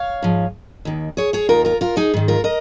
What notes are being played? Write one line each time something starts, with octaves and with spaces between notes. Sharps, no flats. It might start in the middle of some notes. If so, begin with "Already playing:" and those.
Already playing: C#5 F5
G#2 F3
D#2 D#3
G#4 C#5
G#4 C#5
D#2 D#3 F4 A#4
F4 A#4
F4 A#4
D#4 G#4
G#2 D#3
F4 A#4
A#4 D#5